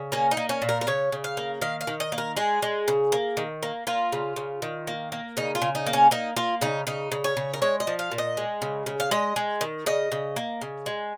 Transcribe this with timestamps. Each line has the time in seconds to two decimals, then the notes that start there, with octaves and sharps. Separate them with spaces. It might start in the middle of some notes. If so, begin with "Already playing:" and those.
Already playing: C#3
0.12 A#3 C#4
0.31 D#4
0.37 A#3
0.49 C#4
0.62 A#2
0.69 A#4
0.81 A#4
0.87 C#3 C#5
1.12 C#3
1.24 F5
1.37 A#3
1.61 D#3 F5
1.81 F5
1.87 D#3
2.00 D#5
2.12 A#3
2.18 A#4
2.37 G#3 G#4
2.62 G#3
2.88 C#3
3.12 A#3
3.37 D#3
3.63 A#3
3.87 A#3 F4
4.12 C#3
4.36 C#3
4.62 D#3
4.87 A#3
5.12 A#3
5.37 C#3 D#4
5.55 F4
5.62 C#3
5.75 D#4
5.86 A#3
5.93 C#4
6.11 A#3 D#4
6.36 A#3 F4
6.61 C#3 D#4
6.87 C#3 D#4
7.12 C#3
7.24 C#5
7.37 C#3
7.54 A#4
7.62 G#3 C#5
7.80 D#5
7.87 F3
7.99 F5
8.12 A#2
8.18 D#5
8.37 G#3
8.62 C#3
8.86 C#3
9.00 F5
9.11 G#3 D#5
9.36 G#3
9.61 D#3
9.86 C#3 D#5
10.12 C#3
10.36 A#3
10.61 C#3
10.86 G#3